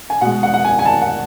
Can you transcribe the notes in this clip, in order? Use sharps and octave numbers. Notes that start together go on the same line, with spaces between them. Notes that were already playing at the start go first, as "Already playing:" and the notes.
G#5
B2 G#3 F#5
F#5
F#5
G#5
G#5
A5
F#5